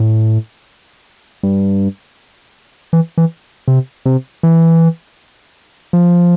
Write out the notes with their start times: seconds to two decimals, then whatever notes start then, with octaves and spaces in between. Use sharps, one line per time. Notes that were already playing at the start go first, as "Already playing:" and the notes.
Already playing: A2
1.43 G2
2.93 E3
3.18 E3
3.68 C3
4.05 C3
4.43 E3
5.93 F3